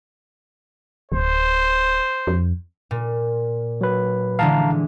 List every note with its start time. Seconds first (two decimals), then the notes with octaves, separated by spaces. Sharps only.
1.12 D1 C5
2.27 F2
2.91 A#2
3.81 F#3 B4
4.39 D3 E3 G#3 F5 A5 A#5